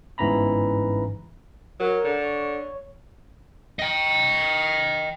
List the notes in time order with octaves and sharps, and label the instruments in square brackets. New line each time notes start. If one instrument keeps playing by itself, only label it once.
[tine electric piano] G1 G#2 E3 C#4 A#5 B5
[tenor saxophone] F#3 [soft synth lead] A#4
[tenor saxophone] D3
[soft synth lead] C#5
[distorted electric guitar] D#5 G5